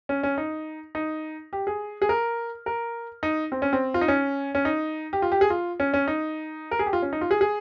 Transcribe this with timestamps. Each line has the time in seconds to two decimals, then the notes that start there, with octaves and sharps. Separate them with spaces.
0.09 C#4
0.23 C#4
0.38 D#4
0.95 D#4
1.53 G4
1.67 G#4
2.02 G#4
2.09 A#4
2.66 A#4
3.23 D#4
3.52 C4
3.62 C#4
3.73 C4
3.94 F4
4.01 D#4
4.08 C#4
4.55 C#4
4.65 D#4
5.13 G4
5.22 F4
5.32 G4
5.41 G#4
5.50 F4
5.80 C#4
5.94 C#4
6.08 D#4
6.71 A#4
6.79 G#4
6.86 G4
6.93 F4
7.02 C#4
7.13 D#4
7.21 F4
7.31 G#4
7.41 G#4